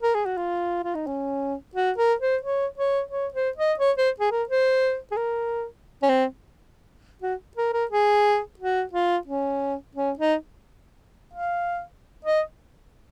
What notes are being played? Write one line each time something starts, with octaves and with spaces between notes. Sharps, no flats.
A#4
G#4
F#4
F4
F4
D#4
C#4
F#4
A#4
C5
C#5
C#5
C#5
C5
D#5
C#5
C5
G#4
A#4
C5
G#4
A#4
C#4
C4
F#4
A#4
A#4
G#4
F#4
F4
C#4
C#4
D#4
F5
D#5